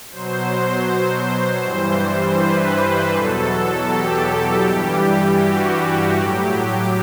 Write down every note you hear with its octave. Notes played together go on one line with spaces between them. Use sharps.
B2 F#3 C5
G2 E3 G3
B4
E2 B2 F#3 A4
G4
G2 E3 G3 G4
F#4
A2 F#3 G4